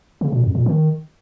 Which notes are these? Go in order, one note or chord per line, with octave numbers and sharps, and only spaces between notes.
C#3
A#2
F2
A#2
D#3